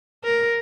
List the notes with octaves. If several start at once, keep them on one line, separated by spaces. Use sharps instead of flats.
A#4